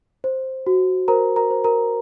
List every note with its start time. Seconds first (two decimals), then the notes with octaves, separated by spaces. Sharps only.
0.24 C5
0.67 F#4
1.08 A#4 C5 A#5
1.36 A#4 A#5
1.51 C5
1.64 A#4 A#5